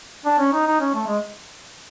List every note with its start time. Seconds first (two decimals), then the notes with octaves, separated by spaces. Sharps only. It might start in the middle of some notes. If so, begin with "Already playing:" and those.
0.25 D4
0.39 C#4
0.52 D#4
0.67 D#4
0.80 C#4
0.95 A3
1.07 G#3